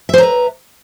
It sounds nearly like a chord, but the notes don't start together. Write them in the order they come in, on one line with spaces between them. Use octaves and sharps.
E5 C5 A#5 B4